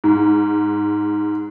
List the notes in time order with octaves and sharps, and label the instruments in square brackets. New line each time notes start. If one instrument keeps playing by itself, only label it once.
[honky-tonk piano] G#2